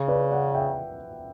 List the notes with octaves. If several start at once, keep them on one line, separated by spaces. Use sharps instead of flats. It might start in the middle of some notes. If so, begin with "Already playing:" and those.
Already playing: C#3
B4 D5
D5 F#5
E5 G5